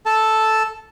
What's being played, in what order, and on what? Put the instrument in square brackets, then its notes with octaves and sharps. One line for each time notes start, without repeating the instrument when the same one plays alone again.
[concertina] A4 A5